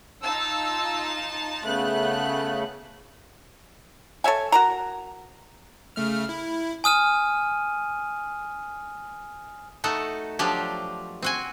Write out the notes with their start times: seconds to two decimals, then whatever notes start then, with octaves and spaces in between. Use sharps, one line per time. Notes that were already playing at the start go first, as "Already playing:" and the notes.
0.22 D#4 F4 A5 E6
1.63 C#3 A3 B3 F#6
4.24 A4 C#5 E5 G#5
4.52 F#4 A#4 A#5
5.96 C#3 A3 F6
6.29 E4
6.84 G#5 D#6 F6 D#7
9.84 A3 D#4 F#4 A4
10.39 F3 F#3 D4 G4
11.22 C4 F#4 G#5